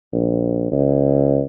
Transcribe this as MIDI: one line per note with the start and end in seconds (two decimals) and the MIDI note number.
0.13 0.71 34
0.72 1.41 37